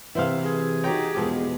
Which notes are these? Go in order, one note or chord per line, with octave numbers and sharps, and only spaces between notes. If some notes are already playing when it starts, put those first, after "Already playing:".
C3 E3 E4 C5 F5
G#4
D#4 F#4 G4 C#5 G5 A#5
E2 B2 F3 G#3